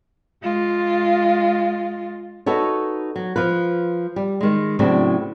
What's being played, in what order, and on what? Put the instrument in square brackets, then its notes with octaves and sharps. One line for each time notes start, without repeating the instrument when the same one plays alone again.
[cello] G#3 F4
[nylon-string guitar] D#4 F#4 A4 B4 C#5
F#3
F3 F4 B4
G3
D#3 G#3
A2 C#3 F#3 C4 D4